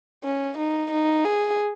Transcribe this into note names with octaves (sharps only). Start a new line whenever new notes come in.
C#4
D#4
D#4
G#4